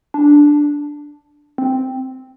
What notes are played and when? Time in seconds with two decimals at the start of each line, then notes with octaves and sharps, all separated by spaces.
0.14 D4
1.58 C4